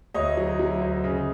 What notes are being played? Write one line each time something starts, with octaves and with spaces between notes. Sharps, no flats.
D2 C#5 D#5
F#3
F#3
D2
C#3